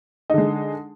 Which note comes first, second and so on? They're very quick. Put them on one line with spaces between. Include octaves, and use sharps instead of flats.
D#4 D3 G#3